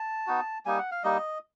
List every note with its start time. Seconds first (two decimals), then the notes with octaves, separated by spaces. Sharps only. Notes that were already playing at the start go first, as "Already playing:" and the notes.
Already playing: A5
0.27 B3 D#4 F#4
0.66 G3 A#3 D#4 G#5
0.79 F#5
0.91 F5
1.04 G3 A#3 D#4 D#5